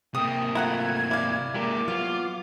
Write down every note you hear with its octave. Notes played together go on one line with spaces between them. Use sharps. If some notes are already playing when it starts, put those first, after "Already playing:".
C3 A#3 G5 D#6
A3 E4 F4 F#5 A#5 G#6
E4 D5 F5
G#3 A#3 E4 G4 A#4 D6
F#3 B3 F4 F5